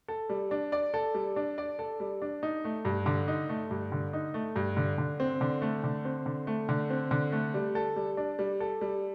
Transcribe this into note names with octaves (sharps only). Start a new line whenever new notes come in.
A4
G3
D4
D5
A4
G3
D4
D5
A4
G3
D4
D#4
A3
G2
D3
D#4
A3
G2
D3
D#4
A3
G2
D3
D3
C4
D3
A3
D3
C4
D3
A3
D3
C4
D3
A3
G3
A4
G3
D4
G3
A4
G3